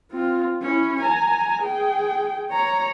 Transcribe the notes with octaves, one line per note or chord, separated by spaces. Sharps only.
C4 F4
C#4 E4
G#5 A#5
G#4 G5
C#5 A#5